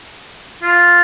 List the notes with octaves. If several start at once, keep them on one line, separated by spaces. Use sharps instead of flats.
F4